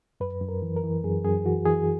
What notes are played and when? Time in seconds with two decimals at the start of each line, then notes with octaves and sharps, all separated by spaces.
0.20 F#2 B4
0.41 F#2
0.49 A#4
0.62 E3
0.76 A#4
0.84 E3
1.04 F#2 G#4
1.25 F#2 G#4
1.45 E3 F#4
1.65 E3 G#4